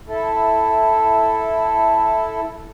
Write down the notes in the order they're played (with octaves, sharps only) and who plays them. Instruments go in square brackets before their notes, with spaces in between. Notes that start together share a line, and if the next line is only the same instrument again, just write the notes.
[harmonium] E4 A4